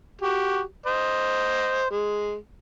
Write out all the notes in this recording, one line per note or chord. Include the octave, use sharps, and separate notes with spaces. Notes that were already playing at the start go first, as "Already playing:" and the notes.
F#4 G4
C5 D#5
G#3